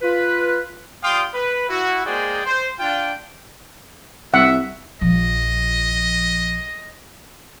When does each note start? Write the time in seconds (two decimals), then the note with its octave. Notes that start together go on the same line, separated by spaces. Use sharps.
0.02 F4 B4
1.03 G3 F4 F5 G5 C6 D#6
1.34 B4
1.69 E4 F#4
2.06 G#3 A#3 G#4 C5 D5 G5
2.46 C5
2.80 D4 F4 G5
4.34 C2 E5 F#5
5.01 A#1 F3 D#5